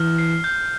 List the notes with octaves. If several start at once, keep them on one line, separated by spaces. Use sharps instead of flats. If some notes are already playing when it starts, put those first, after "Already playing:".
Already playing: E3 F6
C7
G6